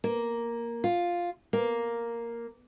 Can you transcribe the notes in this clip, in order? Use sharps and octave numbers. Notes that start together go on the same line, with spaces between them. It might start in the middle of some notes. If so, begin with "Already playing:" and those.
A#3
F4
A#3